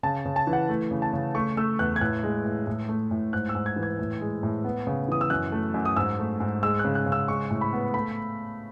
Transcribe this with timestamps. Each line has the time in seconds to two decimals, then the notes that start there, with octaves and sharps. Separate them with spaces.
0.03 C#3 A5
0.25 C#3
0.36 A5
0.47 E3
0.53 F#5
0.69 A3
0.91 C#3
1.02 A5
1.13 C#3
1.35 A3 C#6
1.57 A3 E6
1.79 E2 F#6
1.96 G#6
2.01 A2 F#6
2.23 G#3
2.45 A2
2.67 A2
2.89 A3
3.11 A2
3.33 G#2 F#6
3.49 E6
3.55 G#2
3.66 G#6
3.76 E3
3.83 G#6
3.99 A2
4.21 G#3
4.43 A2
4.64 B3
4.87 C#3
5.08 E3 D#6
5.21 E6
5.30 F#2 F#6
5.52 A3
5.74 F#2
5.85 D#6
5.96 G#2 E6
6.19 A3
6.40 G#2
6.63 G#3 E6
6.79 F#6
6.85 C#3
6.95 F#6
7.06 C#3
7.12 E6
7.28 G#3 C#6
7.50 A2
7.61 B5
7.73 B3
7.94 A3 B5